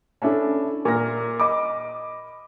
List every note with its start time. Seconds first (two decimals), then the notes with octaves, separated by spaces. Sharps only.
0.22 C#4 D4 E4 A4
0.85 A#2 A#4 A#6
1.40 D#5 B5 D6